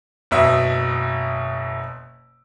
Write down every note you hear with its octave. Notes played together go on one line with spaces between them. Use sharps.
F#1 B2 E5 D#6